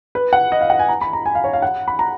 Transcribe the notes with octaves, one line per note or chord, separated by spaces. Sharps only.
B4
F#5
D#5
F5
F#5
G#5
A#5
B5
A#5
G#5
F5
C#5
F5
F#5
B5
A#5